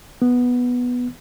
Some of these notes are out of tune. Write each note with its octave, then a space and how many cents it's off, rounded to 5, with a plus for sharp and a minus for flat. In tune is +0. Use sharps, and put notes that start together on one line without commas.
B3 -5